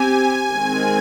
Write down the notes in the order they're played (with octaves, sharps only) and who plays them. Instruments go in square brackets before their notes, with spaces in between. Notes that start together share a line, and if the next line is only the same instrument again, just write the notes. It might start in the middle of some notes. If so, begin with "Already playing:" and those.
Already playing: [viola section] C4 G4 [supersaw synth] G#5
[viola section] D#3 G#3 C4